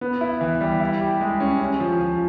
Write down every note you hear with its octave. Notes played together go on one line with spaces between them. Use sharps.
B3
E4
E3
G3
E4
G4
G#3
C#4
C#4
F3
F3